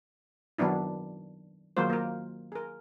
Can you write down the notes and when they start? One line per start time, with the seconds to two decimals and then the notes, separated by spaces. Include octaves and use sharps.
0.58 D#3 F#3 B3 D4 E4
1.77 D#3 F#3 G#3 A#3 F4 C5
1.90 A#3 A#4
2.52 G#4 A#4